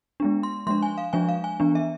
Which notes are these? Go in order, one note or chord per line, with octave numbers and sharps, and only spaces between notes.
G#3 B3 D4
C6
F3 G#3 D4 C6
G#5
F5
F3 G#3 D4 G#5
F5
G#5
E3 B3 D4
E5